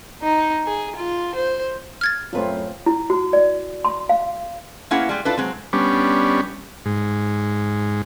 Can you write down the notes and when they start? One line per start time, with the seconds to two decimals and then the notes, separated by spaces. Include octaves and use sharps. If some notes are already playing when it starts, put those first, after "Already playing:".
0.22 D#4
0.66 G#4
0.96 F4
1.35 C5
2.01 F6 G#6 A6
2.33 F#2 A3 C4 F4 B4
2.86 E4
3.10 F#4
3.33 D5
3.85 C6
4.09 F5
4.91 A#3 B3 C#4 E4 G#4 F#5
5.09 G3 G#3 G4
5.25 D4 E4 F4 A4 B4
5.38 F#3 G#3 C4
5.73 G3 B3 C#4 D4
6.85 G#2